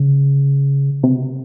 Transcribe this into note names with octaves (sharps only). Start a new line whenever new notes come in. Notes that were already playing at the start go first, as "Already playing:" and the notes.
Already playing: C#3
C3